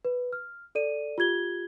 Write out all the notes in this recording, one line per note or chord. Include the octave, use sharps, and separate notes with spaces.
B4
F6
A4 D5 D#7
F4 G4 G#6 G7